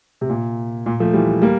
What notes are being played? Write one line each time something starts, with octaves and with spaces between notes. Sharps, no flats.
C3
A#2
A#2
F3 A3
E3 G3
G3 A#3